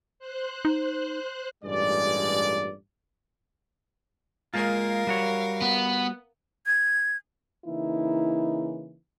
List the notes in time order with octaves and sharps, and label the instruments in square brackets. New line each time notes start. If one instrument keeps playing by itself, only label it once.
[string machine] C5 F#6
[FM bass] D#4
[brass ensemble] A1 G2 A#2 G#3 D5
[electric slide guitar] G#3 A#3 F4 [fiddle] A#4 F5
[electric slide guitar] G3 F#4 C#5
[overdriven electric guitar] B3
[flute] G#6
[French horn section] C#3 E3 A#3 D#4 E4